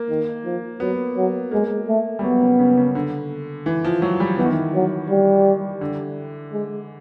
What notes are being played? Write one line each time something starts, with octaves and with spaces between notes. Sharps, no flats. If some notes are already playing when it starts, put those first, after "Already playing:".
Already playing: A#3
D#3
F3
F#3 B3
F#3
G#3 A#3
A3
G3
F#3 B3
C#3
C#3
C#3
D3
E3
F3
F#3
G3
E3 B3
D#3
E3
F#3
G3
D3
G#3